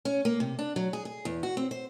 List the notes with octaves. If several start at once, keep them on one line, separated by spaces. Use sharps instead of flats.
C#4
A#3
C3
D4
F#3
G#4
G#4
E2
F#4
C4
C5